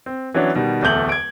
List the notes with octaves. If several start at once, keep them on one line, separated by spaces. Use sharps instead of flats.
C4
E3 F#3 B3 C#4 D4
B2 D#3 G3
D1 E2 A3 G6 F#7
G#6 D7